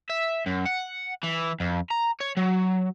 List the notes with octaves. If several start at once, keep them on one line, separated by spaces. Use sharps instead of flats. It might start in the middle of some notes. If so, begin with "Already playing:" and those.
E5
F#2
F#5
E3
F2
A#5
C#5
F#3